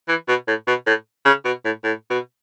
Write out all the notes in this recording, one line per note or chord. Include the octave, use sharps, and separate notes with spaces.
E3
B2
A2
B2
A2
C#3
B2
A2
A2
B2